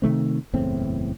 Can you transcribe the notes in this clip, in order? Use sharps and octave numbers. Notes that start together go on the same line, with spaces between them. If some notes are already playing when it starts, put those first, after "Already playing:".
C3 D#3 A3 C4
F#1 E2 A2 C4